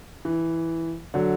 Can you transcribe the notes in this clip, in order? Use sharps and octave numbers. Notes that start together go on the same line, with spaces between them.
E3
D3 F#3